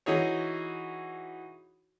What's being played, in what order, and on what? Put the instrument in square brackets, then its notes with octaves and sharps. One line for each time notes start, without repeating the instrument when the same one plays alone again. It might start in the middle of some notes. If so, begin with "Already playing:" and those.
[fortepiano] E3 D#4 F#4 G#4 C#5